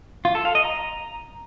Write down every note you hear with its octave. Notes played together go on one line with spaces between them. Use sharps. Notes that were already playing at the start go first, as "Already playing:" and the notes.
F4
A4
F5
D#5
A#5